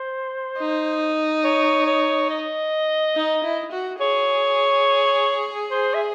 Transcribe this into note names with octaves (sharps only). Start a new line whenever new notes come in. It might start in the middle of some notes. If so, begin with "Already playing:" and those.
Already playing: C5
D#4
C#5
C#5
D#5
D#4
E4
F#4
G#4 C#5
C5
E5